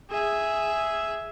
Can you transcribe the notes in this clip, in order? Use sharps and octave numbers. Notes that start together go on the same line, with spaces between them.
G#4 E5